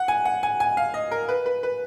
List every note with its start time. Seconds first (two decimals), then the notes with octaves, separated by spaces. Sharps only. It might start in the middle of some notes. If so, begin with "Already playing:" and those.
Already playing: F#5
0.08 G#5
0.25 F#5
0.43 G#5
0.60 G#5
0.77 F5
0.94 D#5
1.11 A#4
1.29 B4
1.46 B4
1.63 B4